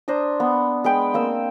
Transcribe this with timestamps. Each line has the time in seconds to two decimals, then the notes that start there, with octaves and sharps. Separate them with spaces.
0.08 D4 C5 A#5 D#6
0.40 B3
0.84 G#3 B4 G5
1.14 A#3 C4 E6